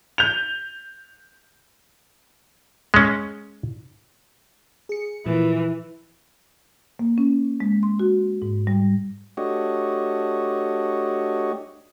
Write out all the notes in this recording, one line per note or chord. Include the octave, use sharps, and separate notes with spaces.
G6 F7
G#3 C#4
G#4 C#7
A#2 E3 F3 A#3
A#3
C#4
G#3
C6
F#4
G#2
G3
A3 D4 F#4 G4 C#5 D#5